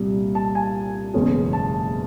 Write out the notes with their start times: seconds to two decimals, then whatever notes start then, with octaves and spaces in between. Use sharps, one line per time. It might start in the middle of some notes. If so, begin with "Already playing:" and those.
Already playing: C2 A#2 G3
0.35 A5
0.55 G#5
1.14 F#1 E2 B2 G#3 C#4
1.53 A5